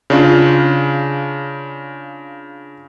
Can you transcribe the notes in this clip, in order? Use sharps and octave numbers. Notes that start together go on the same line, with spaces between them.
C#3 D4 F4